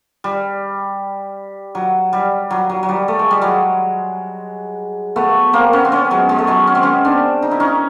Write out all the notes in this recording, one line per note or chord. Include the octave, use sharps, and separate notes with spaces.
G3
F#3
G3
F#3
F#3
F#3
G3
A3
G#3
G3
F#3 G#3
A3 B3
A#3 C4
B3 C#4
C4
B3 C#4
F#3 G#3
G#3
A3
F#3 G#3
C#4
C4
B3 C#4
C4 D4
D#4
E4
C#4 D#4